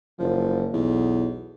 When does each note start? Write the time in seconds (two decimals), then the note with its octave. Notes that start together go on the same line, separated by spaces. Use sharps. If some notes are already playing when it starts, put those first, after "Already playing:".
0.19 F#1 F3
0.73 B1 E2